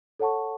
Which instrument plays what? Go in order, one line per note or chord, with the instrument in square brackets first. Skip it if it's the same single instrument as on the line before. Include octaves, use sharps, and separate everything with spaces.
[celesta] A4 C#5 F#5 A5 C#6